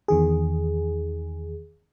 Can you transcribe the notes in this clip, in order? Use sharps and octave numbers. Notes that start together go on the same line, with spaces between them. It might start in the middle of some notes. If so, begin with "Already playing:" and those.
E2 D#3 G#4